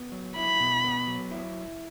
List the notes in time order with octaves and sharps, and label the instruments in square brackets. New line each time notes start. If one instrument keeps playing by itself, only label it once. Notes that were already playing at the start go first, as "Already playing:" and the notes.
Already playing: [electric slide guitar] B3
F#3
[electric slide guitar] E4 [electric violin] B5
[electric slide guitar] B2
B3
F#3
E4